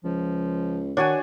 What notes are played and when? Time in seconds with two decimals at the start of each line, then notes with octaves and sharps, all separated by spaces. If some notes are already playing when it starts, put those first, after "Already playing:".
0.04 C#2 F3
0.97 D#3 D4 F#4 C#5 G#5